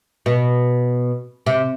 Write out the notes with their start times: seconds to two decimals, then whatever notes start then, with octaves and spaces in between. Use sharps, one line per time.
0.26 B2
1.46 C3